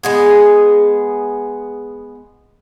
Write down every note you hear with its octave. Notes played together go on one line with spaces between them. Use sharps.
G#3 B3 G#4